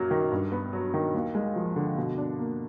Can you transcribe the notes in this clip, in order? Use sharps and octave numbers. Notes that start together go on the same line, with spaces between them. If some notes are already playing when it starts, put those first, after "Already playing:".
Already playing: F#2 F#3 A#3
D#3
G2
B3
F#3
D#3
D#2
G#3
F3
D3
B2
D4
A#3